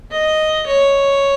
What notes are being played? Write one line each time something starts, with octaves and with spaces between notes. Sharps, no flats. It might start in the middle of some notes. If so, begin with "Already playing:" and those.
D#5
C#5